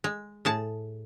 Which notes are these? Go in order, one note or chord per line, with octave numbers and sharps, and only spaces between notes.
G#3
A2 G#4 A5